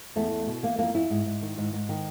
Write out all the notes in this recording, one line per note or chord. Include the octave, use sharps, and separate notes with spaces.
E2 A3
E2
B2
E3 A#3
F2 A#3
F2 E4
G#2
G#2
D#3
G#2
G#2
D#3